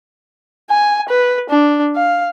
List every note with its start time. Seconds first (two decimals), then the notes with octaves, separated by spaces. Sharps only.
0.70 G#5
1.08 B4
1.49 D4
1.96 F5